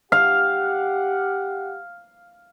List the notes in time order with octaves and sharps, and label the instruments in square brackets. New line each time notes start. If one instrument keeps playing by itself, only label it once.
[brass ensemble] G4 F#5 [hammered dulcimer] F5